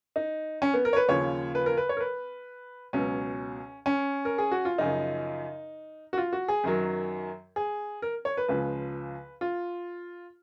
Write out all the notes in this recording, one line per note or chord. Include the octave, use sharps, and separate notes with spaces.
D#4
C#4
B3
A#4
C#5
B4
D#2 C#3 F3 C#5
B4
A#4
B4
C#5
A#4
B4
C#2 B2 F#3 C#4
C#4
A#4
G#4
F#4
F4
F#2 C#3 F3 D#4
F#4
F4
F#4
G#4
F#2 D#3 F#3
G#4
A#4
C#5
B4
C#2 C#3 F3 B4
F4